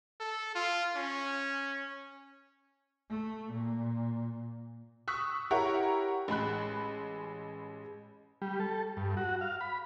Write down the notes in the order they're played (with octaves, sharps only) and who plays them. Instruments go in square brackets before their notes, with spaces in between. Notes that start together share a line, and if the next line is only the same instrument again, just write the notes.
[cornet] A4
F4
C#4
[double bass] A3
A#2
[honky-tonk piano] C#6 D#6 E6 F#6 B6
E4 G4 A#4 C#5 E5 F#5
A1 G#3 B5 F#6
[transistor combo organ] G3
A4
G2
F#4
F5
B5